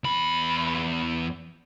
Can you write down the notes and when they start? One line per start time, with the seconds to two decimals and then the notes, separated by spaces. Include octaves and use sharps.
0.04 E2 B5